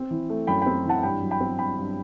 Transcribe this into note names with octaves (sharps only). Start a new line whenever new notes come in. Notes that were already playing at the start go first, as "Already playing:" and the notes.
Already playing: C4
E3
A3
F#2 G5 B5
C4 G5 B5
E3 F#5 A5
G2 G5 B5
F#3
G5 B5
C4
G2 G5 B5
G2